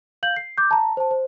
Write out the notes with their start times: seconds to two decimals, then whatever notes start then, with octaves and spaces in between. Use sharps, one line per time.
0.23 F5 G6 F#7
0.36 C7
0.58 D6 G6
0.71 A5 A#5
0.97 C5 A5
1.11 C5